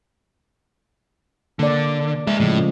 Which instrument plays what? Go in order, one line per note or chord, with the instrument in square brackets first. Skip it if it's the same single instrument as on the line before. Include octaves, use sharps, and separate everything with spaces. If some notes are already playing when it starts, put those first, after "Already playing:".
[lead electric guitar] D3 [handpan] A#3 D5
[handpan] G#3 [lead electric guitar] G#4 E5
[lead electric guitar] A2 [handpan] C#3 F3 A3